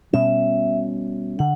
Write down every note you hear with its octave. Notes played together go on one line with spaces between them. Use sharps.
B2 G3 C#4 E5
D3 F#5